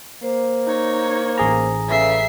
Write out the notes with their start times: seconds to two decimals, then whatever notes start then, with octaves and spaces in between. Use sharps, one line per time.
0.23 A#3 C5
0.65 D#4 C#5
1.38 A1 G#4 A#5
1.89 C#3 A4 B4 E5 C7